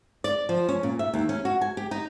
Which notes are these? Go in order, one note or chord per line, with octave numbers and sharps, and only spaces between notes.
D5
F3
C#4
A#2
E5
D#2
C#4
F#4
G#5
G4
D#4